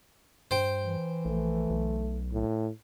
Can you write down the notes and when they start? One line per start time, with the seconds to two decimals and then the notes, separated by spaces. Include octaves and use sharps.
0.51 G2 C5 G5
0.82 E3
1.25 A#1 A3
1.70 B1
2.32 A2